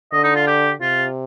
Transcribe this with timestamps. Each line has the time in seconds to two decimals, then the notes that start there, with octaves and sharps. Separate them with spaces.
0.13 D3 D#5
0.24 D#4
0.35 F4
0.47 G4
0.81 C3 F4